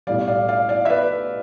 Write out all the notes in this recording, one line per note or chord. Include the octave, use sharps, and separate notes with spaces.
B1 A2 G3 D5 F5
D5 F5
D5 F5
D5 F5
E5
B4 D5